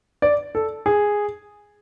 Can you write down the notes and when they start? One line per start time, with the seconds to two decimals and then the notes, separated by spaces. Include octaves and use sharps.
0.22 D5
0.55 A4
0.86 G#4